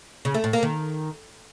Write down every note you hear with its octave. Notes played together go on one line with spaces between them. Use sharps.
C#3
A3
A2
A#3
D#3